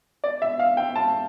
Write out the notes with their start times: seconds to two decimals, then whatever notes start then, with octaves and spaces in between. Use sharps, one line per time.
0.24 D5
0.42 E5
0.59 F5
0.77 G5
0.96 A5